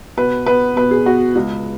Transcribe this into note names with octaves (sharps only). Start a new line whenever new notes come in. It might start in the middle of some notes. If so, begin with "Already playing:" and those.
B2 B4
B3 B4
B2 B4
G#4
B3 F#4
C#2